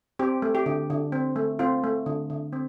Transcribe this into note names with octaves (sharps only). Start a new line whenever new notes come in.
C4 G4
A3
G4
D3
D3
C4
A3
C4 F4
A3
D3
D3
C4